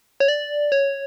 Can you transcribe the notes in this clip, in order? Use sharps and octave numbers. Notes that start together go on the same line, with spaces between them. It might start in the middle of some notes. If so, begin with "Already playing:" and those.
C#5
D5
C#5